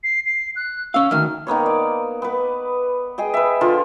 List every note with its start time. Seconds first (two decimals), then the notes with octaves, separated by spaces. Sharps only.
0.04 C7
0.26 C7
0.56 F#6
0.94 C#4 F5 E6
1.11 D2 D#3 F6
1.47 D#3 A#3 B3 C#5
1.66 D5
2.22 B3 B4
3.18 G#4 D#5 G5
3.34 B4 E5
3.61 D3 F3 F4